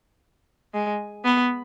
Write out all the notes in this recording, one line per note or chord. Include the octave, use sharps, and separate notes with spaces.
G#3
B3